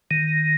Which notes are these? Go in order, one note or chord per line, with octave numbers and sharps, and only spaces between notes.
D#3